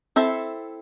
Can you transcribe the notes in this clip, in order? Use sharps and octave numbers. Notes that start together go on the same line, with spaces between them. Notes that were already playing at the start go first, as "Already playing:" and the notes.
C4 E4 A4 E5